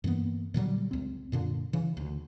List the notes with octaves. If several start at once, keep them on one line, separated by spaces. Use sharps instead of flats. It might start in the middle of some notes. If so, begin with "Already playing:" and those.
G2 E3 A#3 B3
A#2 D3 F#3 G3
C#2 C4
F#2 A#2 D3
C#3 E3
D2